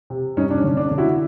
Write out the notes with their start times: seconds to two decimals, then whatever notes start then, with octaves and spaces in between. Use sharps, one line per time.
0.10 C3
0.37 G2 C#4 D#4
0.50 D4
0.58 C#4
0.64 D3
0.77 D4
0.91 D3
0.98 E4 F#4